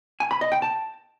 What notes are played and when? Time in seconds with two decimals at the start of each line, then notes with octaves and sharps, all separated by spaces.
0.20 G#5
0.31 B5
0.41 D#5
0.52 G5
0.62 A5